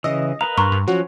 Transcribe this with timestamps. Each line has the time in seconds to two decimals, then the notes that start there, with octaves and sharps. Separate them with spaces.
0.04 C#3 E3 D#5 E6
0.41 A#4 B4 F5 A#5
0.58 G2 A#5 C6 C#6
0.72 G2
0.88 F3 F#3 C#4 F#4